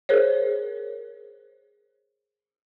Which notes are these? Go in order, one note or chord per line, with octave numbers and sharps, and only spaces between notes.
G#4 A#4 C5 C#5